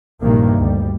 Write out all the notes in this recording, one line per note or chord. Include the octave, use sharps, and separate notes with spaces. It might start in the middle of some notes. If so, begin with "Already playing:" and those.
A#1 G2 C3 D#3 A#3
D2 G3